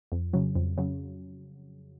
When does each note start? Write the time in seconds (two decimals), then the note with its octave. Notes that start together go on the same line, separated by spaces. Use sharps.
0.12 F2
0.33 C#3 F#3
0.56 F2
0.78 C#3 F#3